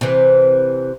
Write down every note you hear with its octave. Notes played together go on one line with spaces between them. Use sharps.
C3 E3